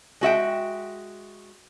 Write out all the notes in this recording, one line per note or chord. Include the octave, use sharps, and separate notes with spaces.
G#3 F#4 E5 G5